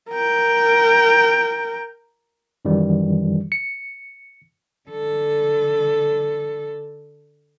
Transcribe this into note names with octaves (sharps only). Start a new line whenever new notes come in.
A#4 G5
F#2 D#3 E3 G3
C#7
D3 A4